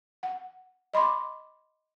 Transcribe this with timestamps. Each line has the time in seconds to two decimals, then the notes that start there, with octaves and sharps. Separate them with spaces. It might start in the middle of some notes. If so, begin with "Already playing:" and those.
0.23 F#5
0.94 D#5 B5 C6 D6